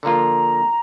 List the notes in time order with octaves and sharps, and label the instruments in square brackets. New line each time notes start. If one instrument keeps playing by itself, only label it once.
[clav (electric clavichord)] D3 F3 A#3 F4 [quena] A#5